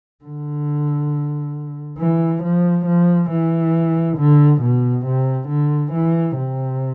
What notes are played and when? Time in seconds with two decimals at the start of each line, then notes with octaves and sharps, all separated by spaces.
0.24 D3
1.98 E3
2.43 F3
2.86 F3
3.30 E3
4.17 D3
4.61 B2
5.05 C3
5.48 D3
5.92 E3
6.36 C3